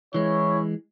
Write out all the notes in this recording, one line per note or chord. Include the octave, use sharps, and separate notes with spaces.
E3 G#3 C#4 E4 C#5